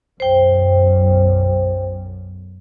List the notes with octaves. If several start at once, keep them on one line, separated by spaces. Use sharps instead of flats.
B1 F#2 C5 G5